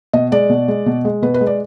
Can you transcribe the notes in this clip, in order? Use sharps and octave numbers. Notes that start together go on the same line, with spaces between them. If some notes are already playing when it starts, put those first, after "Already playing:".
B2 D#5
G#3 D5
B2
G#3
B2
G#3
B2 B4
B4
G#3
D5